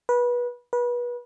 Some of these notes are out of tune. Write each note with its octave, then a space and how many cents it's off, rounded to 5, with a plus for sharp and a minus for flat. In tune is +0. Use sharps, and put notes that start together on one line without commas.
B4 -25
B4 -30